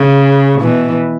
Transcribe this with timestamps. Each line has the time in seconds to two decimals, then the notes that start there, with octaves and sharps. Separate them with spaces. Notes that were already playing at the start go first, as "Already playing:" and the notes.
Already playing: C#3
0.61 B2 E3